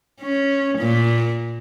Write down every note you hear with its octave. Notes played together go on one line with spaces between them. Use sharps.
C#4
A#2